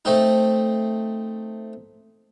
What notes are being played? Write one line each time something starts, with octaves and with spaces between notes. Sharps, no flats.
A3 C4 D#4